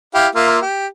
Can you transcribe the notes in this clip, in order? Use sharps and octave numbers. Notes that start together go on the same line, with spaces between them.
E4 G4 F5
A#3 F4 E5
G4